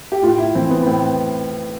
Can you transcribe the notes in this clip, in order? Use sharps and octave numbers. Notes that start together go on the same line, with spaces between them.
G4
A2 F4
E4
E3 C4
B3
B3
A2 C4